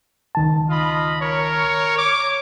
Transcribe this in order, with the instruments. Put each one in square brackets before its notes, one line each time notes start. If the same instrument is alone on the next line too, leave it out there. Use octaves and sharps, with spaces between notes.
[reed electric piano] C#2 D#3 A5
[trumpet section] F4 D#5 B5
A#4 C#5
C#5 D6